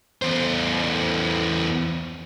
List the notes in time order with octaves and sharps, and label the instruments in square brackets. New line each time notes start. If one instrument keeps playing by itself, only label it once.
[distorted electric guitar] E2 C5